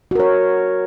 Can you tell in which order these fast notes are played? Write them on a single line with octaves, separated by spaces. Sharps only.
F#4 A#4 C#5